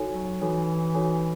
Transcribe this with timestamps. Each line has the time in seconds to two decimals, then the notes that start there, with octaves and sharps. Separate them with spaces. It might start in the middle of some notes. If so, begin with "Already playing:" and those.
Already playing: D#4 F#4 A4 C#5 G#5
0.14 F#3
0.41 E3 D#4 F#4 A4 C#5 G#5
0.95 D#4 F#4 A4 C#5 G#5